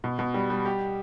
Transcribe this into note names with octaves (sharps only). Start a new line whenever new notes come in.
B2
B2
G3
G3
G4